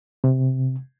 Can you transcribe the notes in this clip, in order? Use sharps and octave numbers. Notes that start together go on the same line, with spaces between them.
C3